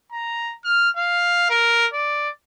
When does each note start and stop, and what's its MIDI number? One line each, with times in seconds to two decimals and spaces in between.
0.13 0.56 82
0.64 0.90 89
0.97 1.47 77
1.50 1.87 70
1.93 2.29 74